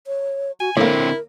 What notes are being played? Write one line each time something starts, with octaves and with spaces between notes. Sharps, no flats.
C#5
F#4 G#5
A2 D3 A#3 C4 E4 A#4